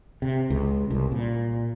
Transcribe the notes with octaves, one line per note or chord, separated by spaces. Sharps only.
C3
C#2
C2
A#2